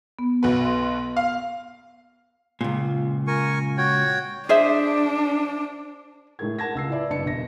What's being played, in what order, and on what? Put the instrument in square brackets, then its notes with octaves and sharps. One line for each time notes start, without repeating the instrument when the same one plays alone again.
[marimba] B3
[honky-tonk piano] B1 F#4 B4
[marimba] C6
[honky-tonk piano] F5
[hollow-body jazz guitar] C#2 A#2
[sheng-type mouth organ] A#4 G#5 C#6
F#4 C#5 G5
[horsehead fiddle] D4 [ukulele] G#4 C5 E5
[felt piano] A2 G#3 G#4 A#4 G#6
A#4 F#5 A5 G#6 A#6
C#2 E6 C7
E4 B4 D5 E5
F#1 G2 B4 D#5 A5 C#7
E1 G2 A#6